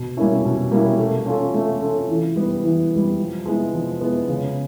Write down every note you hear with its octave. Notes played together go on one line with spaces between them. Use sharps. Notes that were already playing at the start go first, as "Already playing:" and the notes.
Already playing: B2
G3 A#3 C#4 E4
B2
G3 A#3 C#4 E4
A3
C#4 F4 A4
A3
C#4 F4 A4
E3
G3 B3
E3
G3 B3
F3
G#3 B3 E4
F3
G#3 B3 E4
C#3